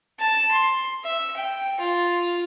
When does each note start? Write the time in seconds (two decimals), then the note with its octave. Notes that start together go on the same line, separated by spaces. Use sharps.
0.19 A5
0.51 C6
1.04 E5
1.37 G5
1.79 F4